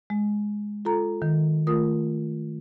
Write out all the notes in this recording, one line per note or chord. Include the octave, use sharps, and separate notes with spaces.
G#3
F4 A4 A#5
D#3
A3 F4 A#4 D#6